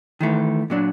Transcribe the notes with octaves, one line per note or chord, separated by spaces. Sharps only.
D#3 E3 A3
A#2 F#3 D4